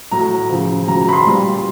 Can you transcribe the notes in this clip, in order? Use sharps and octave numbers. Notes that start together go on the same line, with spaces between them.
A2 F#3 A#5
C#3 F3
C#3 F#3 A#5
A#5
B5
C6
A#2 G3